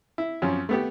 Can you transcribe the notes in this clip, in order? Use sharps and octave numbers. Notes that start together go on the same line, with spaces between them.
E4
F#2 F3 C#4
A3 B3 G4